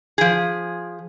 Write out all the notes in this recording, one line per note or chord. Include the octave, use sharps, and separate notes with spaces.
F3 G#4